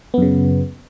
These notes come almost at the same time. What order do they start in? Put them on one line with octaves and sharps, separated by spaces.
B3 F#2 C#3